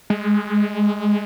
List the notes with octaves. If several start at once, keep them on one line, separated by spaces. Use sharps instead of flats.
G#3